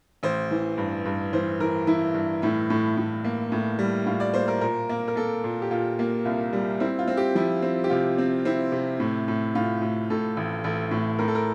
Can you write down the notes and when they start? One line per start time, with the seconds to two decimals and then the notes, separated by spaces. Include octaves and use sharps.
0.23 A1 C5
0.51 E3
0.78 G2
1.05 G2
1.33 E3 C5
1.60 E3 A#4
1.87 E3 E4
2.14 G2
2.42 A2 E4
2.70 A2
2.97 A2
3.24 A#3
3.52 A2
3.79 G3
4.06 A2 F4
4.20 D5
4.34 A#3 C5
4.48 A#4
4.61 A#2 A#4
4.89 A#3
5.08 A#4
5.16 A#3 A4
5.44 A#2
5.62 G4
5.70 A#2 F4
5.99 A#3
6.25 C2 F4
6.53 G3
6.80 C4 E4
6.99 F4
7.08 C4
7.17 G4
7.35 F3 E4
7.62 C4
7.84 G4
7.90 C3 F4
8.18 C4
8.45 C4 E4
8.72 C3
9.00 A2
9.28 A2
9.55 A2 F4
9.82 A2
10.10 A2 A4
10.37 A1
10.64 A1 A4
10.91 A2
11.19 A2 A#4
11.28 A4
11.35 A#4